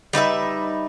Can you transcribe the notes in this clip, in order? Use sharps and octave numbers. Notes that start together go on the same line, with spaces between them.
G3 D#4 B4 E5